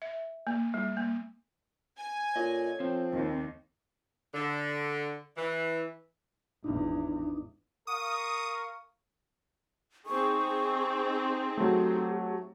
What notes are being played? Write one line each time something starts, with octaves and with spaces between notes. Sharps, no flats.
E5
A#3
G3
A#3
G#5
A#2 C#4 A4 C#5 D#5
F3 C4
D#2
D3
E3
G#1 E2 D4 D#4
A#4 F5 C#6 D#6
C4 D#4 G#4 C#6
F#3 A3 G4